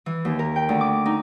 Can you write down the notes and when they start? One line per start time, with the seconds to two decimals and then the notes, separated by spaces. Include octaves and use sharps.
0.06 E3
0.25 D#2
0.39 A#4
0.56 G5
0.69 D2
0.81 D6
1.06 D#4